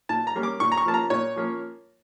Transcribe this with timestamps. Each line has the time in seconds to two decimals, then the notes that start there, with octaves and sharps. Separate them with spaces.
0.09 A#2 A5
0.27 A#5
0.35 G3 A#3 C#4
0.43 D6
0.60 A#2 C#6
0.72 A#5
0.77 C#6
0.85 F3 A#3 C#4 A5
0.94 A#5
1.10 A#2 C#5
1.36 F3 A#3 C#4